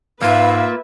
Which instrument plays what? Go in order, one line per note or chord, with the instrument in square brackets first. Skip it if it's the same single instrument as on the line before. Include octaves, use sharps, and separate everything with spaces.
[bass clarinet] G#2 [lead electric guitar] A#3 F4 [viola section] B4 E5 [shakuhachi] F5